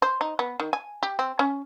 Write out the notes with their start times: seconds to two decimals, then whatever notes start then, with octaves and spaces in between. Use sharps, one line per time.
0.02 C5
0.21 D#4
0.39 B3
0.60 D#3
0.73 G#5
1.03 G4
1.19 C4
1.39 C#4